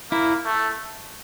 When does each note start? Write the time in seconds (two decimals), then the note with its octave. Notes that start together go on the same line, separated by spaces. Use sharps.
0.11 A#3 E4
0.46 A3